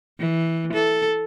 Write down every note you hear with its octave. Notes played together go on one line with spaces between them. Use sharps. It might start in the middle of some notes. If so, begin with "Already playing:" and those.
E3
A4